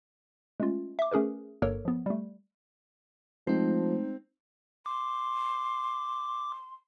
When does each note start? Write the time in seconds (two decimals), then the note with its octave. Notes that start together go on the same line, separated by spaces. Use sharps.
0.60 G#3 A3 C#4 F4
0.99 E5 D6
1.11 A3 C#4 G#4 A#4 B4
1.62 G1 G2 A#3 A4 A#4 C#5
1.85 F3 B3
2.06 G3 A3
3.47 F3 G#3 A3 C4 D#4
4.86 C6 D6